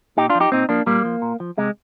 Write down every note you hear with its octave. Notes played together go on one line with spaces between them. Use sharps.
A#2 D#4 G4
D4 F4
F3
D#4 G4
A#2 C4 D#4
F3 A#3 D4
A#2 G3 A#3
F3
A#2
F3
C3 G#3